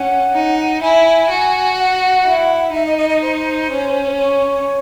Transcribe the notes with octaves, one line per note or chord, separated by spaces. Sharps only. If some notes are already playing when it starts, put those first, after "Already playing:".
Already playing: C#4 F#5
D#4
E4 G#5
F#4
F#5
E4
D#4 E5
D#5
D#5
D#5
C5
C#4
C#5